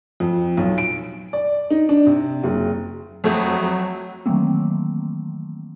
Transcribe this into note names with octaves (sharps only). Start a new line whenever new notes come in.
F2
B1
D7
D5
D#4
D4
C3
F#1
F2 F#3 A3
D#3 E3 F#3 A3 A#3 C4